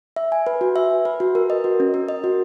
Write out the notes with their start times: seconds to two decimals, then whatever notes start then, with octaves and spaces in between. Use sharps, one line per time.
0.16 E5
0.32 G#5
0.47 B4
0.61 F#4
0.76 E5
0.91 G#5
1.05 B4
1.20 F#4
1.35 A#4
1.50 D#5
1.64 F#4
1.80 C#4
1.94 A#4
2.09 D#5
2.24 F#4